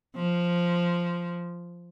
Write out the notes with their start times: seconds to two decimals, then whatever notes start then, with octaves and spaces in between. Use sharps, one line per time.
0.16 F3